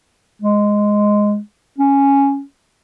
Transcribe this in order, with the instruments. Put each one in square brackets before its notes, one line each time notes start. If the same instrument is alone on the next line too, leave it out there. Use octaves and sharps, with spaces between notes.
[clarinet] G#3
C#4